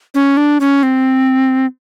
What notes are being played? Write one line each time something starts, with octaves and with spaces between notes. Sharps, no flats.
C#4
D4
C#4
C4